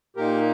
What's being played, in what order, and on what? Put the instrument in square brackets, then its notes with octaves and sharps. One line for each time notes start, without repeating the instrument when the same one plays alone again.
[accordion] A#2 A#3 D#4 G4 A#4